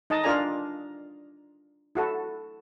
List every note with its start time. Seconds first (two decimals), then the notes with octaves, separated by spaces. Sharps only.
0.10 D#4 D#5 A5
0.23 D4 F4 A#4 D5 G#5 A#5
1.95 E4 F#4 A4